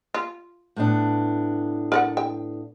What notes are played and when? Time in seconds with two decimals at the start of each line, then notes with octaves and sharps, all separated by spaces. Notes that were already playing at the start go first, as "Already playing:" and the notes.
0.14 F4
0.76 A2 B3 D4
1.92 A#4 D5 F#5
2.17 G5